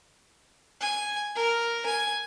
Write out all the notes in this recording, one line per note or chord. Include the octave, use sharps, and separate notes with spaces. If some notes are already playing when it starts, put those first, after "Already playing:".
G#5
A#4
G#5